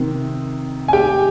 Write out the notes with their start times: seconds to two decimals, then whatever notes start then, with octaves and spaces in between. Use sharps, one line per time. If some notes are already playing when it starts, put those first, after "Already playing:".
Already playing: C3 D#3
0.88 G#5
0.93 G4 G5